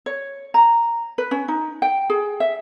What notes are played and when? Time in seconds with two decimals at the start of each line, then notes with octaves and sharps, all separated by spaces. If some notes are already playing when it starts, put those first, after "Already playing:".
0.06 C#5
0.54 A#5
1.18 B4
1.31 C#4
1.48 D#4
1.82 G5
2.10 G#4
2.40 E5